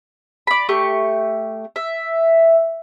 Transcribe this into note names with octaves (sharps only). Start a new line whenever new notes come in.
D5 B5
A3 G4 C#6
E5